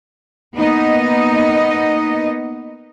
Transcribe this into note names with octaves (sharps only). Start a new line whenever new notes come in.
A#3 B3 D#4 D#5